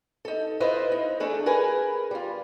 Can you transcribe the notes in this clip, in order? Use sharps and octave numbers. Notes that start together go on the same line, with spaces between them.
D#4 A4
E4 F4 B4 C5 D#5 E5
D#4
E3 A3 D4 G#4 A4
G#4 A#4 B4 G#5
G3 F4